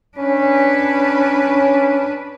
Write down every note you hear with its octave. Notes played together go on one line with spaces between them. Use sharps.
C#4 D4 B4